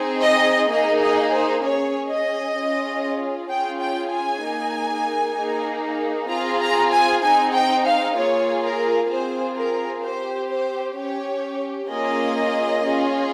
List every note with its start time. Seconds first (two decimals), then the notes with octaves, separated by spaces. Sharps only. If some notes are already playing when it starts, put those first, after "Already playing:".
Already playing: C4 D#4 G#4
0.23 D#5
0.70 A#3 D#4 G#4 D#5
1.01 D#5
1.32 C5
1.63 C#4 G#4 C#5
2.10 D#5
2.56 C#4 F4 G#4
3.49 C#4 F4 G#4 G5
3.81 G5
4.12 G#5
4.43 A#3 D#4 G#4
5.36 A#3 D#4 G#4
6.29 C4 F4 G#4 A#5
6.60 A#5
6.92 G#5
7.23 C4 D#4 G#4 G#5
7.54 G5
7.86 F5
8.16 A#3 F4 G#4 C#5
8.63 A#4
9.09 C4 F4 G#4 C5
9.56 A#4
10.03 C4 G4 C5
10.49 C5
10.96 C#4 G4 C#5
11.89 A#3 C#4 F4 G#4 D#5
12.82 C#4 F4 G#4